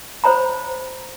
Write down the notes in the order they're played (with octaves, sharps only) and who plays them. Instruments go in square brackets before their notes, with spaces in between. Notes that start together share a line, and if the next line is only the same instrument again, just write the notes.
[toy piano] C5 C#5 A#5 B5